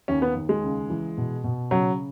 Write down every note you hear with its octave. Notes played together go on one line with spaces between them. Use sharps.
D#2 C#4
B3
D#2
G#3
C#2
E3
B2
B2
C#3 F#3